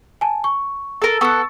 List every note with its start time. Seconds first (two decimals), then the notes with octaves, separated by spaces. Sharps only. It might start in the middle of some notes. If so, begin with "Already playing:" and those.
0.21 G#5 A5
0.44 C#6
1.02 A4 A#4
1.21 B3 A4 C#6 E6